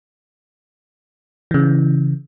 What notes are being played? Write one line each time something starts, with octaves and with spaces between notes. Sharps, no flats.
C#3 E3